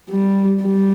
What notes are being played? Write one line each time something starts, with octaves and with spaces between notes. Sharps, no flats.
G3
G3